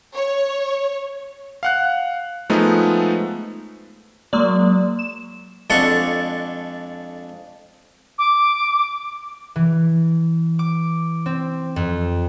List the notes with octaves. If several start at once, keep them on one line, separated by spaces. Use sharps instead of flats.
C#5
F5 F#5 F#6
F3 G#3 A3 B3 D#4
F#3 G#3 A#3 D5
E7
F2 G#3 D4 A4 F#5 C#6
D6
E3
D6
C4
F2